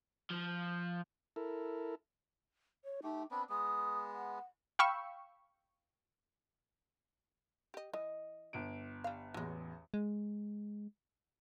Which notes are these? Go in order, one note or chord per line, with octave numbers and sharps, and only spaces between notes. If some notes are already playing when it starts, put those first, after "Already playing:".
F3
E4 A4 A#4
C#5
A3 D#4 G4
B3 C4 D4 B5
G#3 B3 D#6
F#5
F5 G5 B5 C#6 E6
G4 D#5
E3 D#5
G1 D7
G3 F5
A1 E2 F#3 G#3
G#3